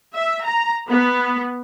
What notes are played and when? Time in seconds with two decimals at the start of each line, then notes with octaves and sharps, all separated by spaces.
0.14 E5
0.43 A#5
0.88 B3